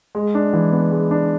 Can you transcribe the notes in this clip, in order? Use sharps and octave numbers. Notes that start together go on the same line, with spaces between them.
G#3
D4
E3
B3
G#3
D4